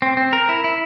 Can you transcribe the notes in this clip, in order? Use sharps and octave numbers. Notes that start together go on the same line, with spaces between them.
C4
C4
A#4
E4
E4